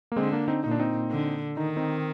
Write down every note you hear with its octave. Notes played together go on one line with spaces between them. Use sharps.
A#3
D3 G#3 C4
A#3 D4
C4 D#4
A#2 D#4
D4
C4 D#4
D3
D#3 D#4
C4 D#4